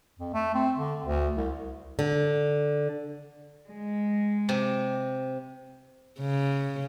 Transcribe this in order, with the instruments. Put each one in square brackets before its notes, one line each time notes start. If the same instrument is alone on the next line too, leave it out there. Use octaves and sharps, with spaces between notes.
[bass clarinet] F2
A3
C4
D3
D2
C2
[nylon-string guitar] D3
[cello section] G#3
[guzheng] C3
[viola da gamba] C#3